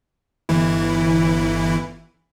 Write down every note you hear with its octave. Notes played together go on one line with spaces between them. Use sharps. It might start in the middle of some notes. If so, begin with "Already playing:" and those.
G1 E3 E4